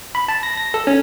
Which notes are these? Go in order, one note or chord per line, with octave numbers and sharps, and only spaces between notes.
B5
A5
A#6
A#6
A4
C#4